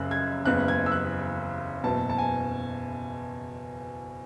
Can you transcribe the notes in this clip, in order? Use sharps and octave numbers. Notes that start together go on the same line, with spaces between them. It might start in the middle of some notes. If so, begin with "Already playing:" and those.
Already playing: F#1 F#2 C#3 F#6
G#6
F#1 E2 C#3 F#6
G#6
E6
F#6
F#1 E2 B2 A5
A5
G#5